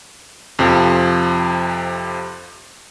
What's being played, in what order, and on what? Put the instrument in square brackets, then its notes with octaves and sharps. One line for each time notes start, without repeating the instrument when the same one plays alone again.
[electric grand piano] F2 C3 F3